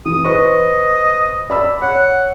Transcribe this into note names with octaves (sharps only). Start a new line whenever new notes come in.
E3 D#6
B4 C5 D#5 C#6
D5 B5 E6
C#5 F#5